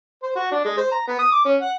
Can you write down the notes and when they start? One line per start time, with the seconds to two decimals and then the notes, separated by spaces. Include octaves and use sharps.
0.23 C5
0.36 F#4
0.51 D4
0.64 G#3
0.78 C5
0.91 A#5
1.08 B3
1.19 D#6
1.32 D6
1.45 C#4
1.61 F#5